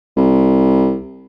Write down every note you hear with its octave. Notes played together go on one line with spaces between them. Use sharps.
C2